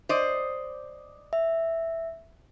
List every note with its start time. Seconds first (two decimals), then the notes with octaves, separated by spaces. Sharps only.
0.09 C5 D5 D#5
1.33 E5